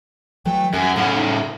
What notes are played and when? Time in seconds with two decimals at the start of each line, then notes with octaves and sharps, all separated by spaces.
0.45 E3 F#3 A3 G5
0.74 F#2 A#4 G#5
0.97 A2 C#3 F#5
1.14 D#4